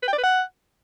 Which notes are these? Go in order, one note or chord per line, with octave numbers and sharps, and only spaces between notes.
B4
G5
D5
B4
F#5